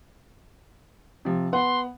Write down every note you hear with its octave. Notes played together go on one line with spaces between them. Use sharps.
C3 F3
B3 F#5 C6